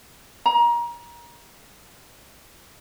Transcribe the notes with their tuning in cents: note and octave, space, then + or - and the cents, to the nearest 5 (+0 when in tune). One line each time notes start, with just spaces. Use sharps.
A#5 +30